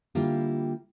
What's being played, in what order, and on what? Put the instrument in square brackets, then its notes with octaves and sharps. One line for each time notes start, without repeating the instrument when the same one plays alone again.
[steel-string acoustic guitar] D3 G3 A#3 E4 F4 G4